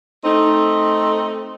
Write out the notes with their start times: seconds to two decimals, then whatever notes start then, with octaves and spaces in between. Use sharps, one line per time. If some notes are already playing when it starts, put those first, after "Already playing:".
0.25 A3 C4 D#4